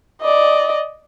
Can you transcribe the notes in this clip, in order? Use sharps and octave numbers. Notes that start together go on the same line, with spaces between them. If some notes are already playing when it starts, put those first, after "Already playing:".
D5 D#5